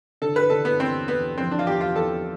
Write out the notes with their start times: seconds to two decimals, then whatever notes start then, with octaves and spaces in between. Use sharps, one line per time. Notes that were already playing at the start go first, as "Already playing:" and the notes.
0.22 D3 A4
0.36 B4
0.50 D3 A4
0.65 B3
0.79 E2 C4
1.08 E2 B3
1.38 F3 C4
1.51 D4
1.59 F4
1.67 E2 G4
1.81 F4
1.95 E2 A4